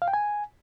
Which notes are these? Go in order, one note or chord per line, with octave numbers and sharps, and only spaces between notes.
F5
G5
G#5